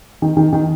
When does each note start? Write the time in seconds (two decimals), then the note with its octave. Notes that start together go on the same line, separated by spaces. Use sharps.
0.22 D#3
0.37 D#3
0.53 D#3